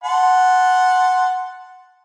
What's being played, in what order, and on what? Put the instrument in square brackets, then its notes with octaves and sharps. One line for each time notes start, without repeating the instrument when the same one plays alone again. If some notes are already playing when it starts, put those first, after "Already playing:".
[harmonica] F#5 A5 C6